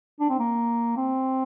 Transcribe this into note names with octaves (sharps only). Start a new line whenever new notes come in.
D4
C4
A#3
C4